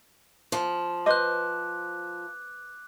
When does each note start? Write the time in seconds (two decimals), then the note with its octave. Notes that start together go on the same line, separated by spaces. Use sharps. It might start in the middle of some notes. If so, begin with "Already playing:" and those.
0.52 F3
1.06 B4 C5 D#5 D6 F#6